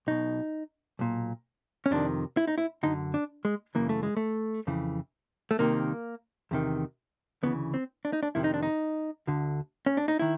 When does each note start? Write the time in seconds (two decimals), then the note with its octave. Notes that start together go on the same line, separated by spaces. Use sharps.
0.07 B1 B2 D#4
0.99 B1 A#2
1.86 C#4
1.91 F2 C3 D#3 D4
2.37 E4
2.47 D#4
2.58 E4
2.83 F#2 D3 D#4
3.14 D4
3.45 G#3
3.75 F#2 C#3 E3 A#3
3.89 A3
4.03 G#3
4.17 A3
4.67 F2 C#3 E3
5.51 A3
5.59 C2 C3 D#3 A#3
6.51 E2 C3 D#3
7.43 D2 C#3 E3 B3
7.74 C4
8.05 D4
8.13 D#4
8.23 D4
8.35 F2 C3 D#3 E4
8.44 D#4
8.54 D4
8.63 D#4
9.27 D2 D3
9.86 C#4
9.97 D4
10.08 D#4
10.19 D#3 E4